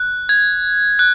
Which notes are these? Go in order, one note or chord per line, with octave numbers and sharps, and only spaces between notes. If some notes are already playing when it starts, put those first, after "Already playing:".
Already playing: F#6
G#6
F#6